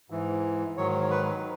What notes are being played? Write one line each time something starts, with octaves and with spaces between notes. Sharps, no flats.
G#2 E3
G#2 D#3 F#3 C#5
B4